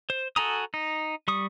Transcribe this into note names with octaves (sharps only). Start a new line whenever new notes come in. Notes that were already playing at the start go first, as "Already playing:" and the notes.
C5
F#4 A4 G#5 A#5 D#6
D#4
G3 C#6 D#6